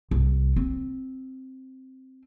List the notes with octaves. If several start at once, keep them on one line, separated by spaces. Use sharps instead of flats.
C2
C4